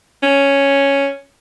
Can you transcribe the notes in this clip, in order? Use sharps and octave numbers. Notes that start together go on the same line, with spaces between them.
C#4